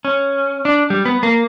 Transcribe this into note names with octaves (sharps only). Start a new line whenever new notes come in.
C#4
D4
G3
B3
A#3